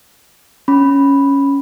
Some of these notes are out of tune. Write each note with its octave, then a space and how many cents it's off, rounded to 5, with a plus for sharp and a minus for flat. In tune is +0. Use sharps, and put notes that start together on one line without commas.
C#4 +0 B5 +0